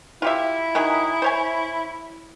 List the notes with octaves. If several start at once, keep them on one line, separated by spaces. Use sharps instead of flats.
E4 F4 G4 E5
D#3 F#3 G#4
C5 C#5 G#5